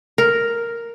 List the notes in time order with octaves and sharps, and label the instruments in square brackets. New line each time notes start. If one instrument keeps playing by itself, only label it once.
[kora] A#4